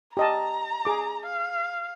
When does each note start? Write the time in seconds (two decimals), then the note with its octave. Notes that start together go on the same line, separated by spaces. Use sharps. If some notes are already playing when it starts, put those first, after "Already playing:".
0.17 G4 D#5 A5 A#5
0.85 G#4 D6
1.26 F5